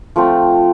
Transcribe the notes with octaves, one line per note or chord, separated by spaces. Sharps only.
F3 A3 C4